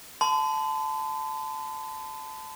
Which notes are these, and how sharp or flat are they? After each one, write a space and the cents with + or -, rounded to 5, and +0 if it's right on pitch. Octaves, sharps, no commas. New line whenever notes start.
A5 -10 C6 -45